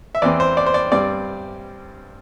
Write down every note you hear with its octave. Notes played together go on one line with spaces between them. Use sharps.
E5
E2 E3 C4 D5
C5
D5
C5
D5
G2 G3 C4 D5